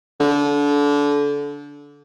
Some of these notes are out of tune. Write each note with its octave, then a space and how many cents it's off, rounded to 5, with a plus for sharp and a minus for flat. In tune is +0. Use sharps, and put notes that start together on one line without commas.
D3 -25